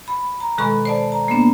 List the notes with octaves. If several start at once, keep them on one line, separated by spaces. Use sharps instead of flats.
B5
A#5
B2 D#3 G#3 A4 B5 C#6
C5 D5 A5
A#5
A#3 B3 D4